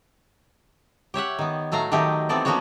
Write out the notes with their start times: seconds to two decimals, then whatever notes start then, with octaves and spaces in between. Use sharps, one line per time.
1.14 G4 C#5 E5 F#5
1.39 D#3 B3
1.72 A2 F#3 A3 F5 A#5
1.92 D#3 F#3 A3 G4 D#5
2.29 D#3 E3 B3 C4 A4 D5
2.45 F3 A#3 B3 C#4 F#4 C#5